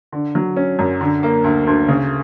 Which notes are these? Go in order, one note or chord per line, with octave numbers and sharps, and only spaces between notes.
D3
F#3
C#4
F#2
D3
A#3
D2
D2
C#3